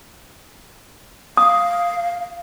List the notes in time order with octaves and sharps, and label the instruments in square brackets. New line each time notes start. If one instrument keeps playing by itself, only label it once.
[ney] F5 [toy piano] D#6